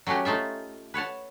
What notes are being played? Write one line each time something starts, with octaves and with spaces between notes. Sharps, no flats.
F#3 A3 C#4 F#4 G4
A3 D#4 F4 E5
B4 C#5 F#5 A5